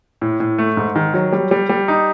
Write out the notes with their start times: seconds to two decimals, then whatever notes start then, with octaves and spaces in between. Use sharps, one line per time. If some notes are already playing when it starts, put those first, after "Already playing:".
0.22 A2
0.40 A2
0.58 A3
0.77 G#2
0.95 D#3
1.14 F#3
1.32 G3
1.51 G3
1.69 G3
1.88 D#4